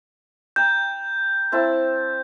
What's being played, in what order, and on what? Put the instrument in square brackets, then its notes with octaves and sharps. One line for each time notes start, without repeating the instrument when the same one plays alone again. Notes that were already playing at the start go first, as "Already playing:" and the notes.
[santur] G5 A#5 [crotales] G6
[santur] C4 E4 A5